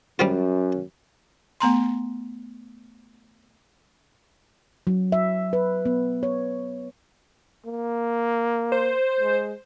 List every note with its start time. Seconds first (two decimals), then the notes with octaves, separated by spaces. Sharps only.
0.19 F#2 G3 C4 F4
1.60 A3 B3 A#5 C6
4.87 F#3
5.12 E5
5.53 B4
5.85 B3
6.23 C#5
7.66 A#3
8.72 C5
9.20 G#3